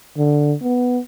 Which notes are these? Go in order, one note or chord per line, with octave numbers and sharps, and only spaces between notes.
D3
B3